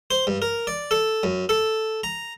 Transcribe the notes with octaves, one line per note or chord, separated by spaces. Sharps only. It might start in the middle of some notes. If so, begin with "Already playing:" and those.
C5
G2
A#4
D5
A4
F#2
A4
A#5